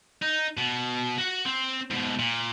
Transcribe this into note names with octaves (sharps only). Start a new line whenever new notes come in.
D#4
B2
F#4 F#5
C4
G#2 B2
A#2